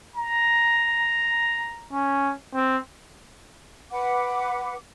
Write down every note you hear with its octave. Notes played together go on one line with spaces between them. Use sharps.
A#5
C#4
C4
B4 F#5 D6